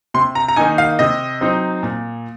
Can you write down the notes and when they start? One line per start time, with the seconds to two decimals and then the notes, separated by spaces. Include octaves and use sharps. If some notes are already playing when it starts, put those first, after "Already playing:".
0.14 C3 C6
0.35 A#5
0.48 A#5
0.56 D#3 A#3 D#4 G#5
0.78 F5
0.99 C3 D#5
1.41 F#3 C4 D#4
1.83 A#2